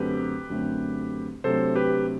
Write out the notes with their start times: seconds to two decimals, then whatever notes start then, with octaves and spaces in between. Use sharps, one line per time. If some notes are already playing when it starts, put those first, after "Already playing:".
Already playing: F#2 D3 A3 C4 G4 B4
0.50 F#2 D3 A3 C4
1.44 C3 F#3 A3 D4 A4 C5
1.75 G4 B4